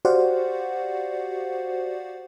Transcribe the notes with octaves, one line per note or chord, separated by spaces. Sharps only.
F#4 G4 C5 D5 F5 F#5